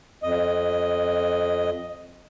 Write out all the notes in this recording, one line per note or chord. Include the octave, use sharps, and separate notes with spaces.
F2 D#5